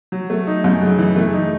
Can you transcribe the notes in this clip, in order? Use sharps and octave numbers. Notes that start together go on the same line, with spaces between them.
F#3
A3
D#4
F#2
C#3
E3
A3
D#4